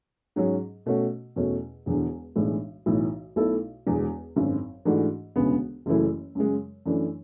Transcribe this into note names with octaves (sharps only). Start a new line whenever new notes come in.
G#2 F#3 C#4 G#4
B2 A3 C#4 F#4
E2 B2 A3 C#4
E1 E2 D3
B1 A2 E3 G#3 D4
B1 A2 E3
B1 B2 A3 E4 A4
E1 E2 D3 G#3
G#1 F#2 D3
G#2 E3 A3 D4 F#4
E1 D2 C#3 G#3 B3
F#1 F#2 E3 A3 E4
F#2 C#3 G#3
F#2 E3 A3 D4